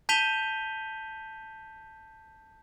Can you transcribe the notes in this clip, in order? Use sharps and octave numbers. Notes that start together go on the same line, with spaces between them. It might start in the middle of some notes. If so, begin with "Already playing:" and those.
A5 G6 B6 D#7 F7 G7